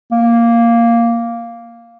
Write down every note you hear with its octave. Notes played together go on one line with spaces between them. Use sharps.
A#3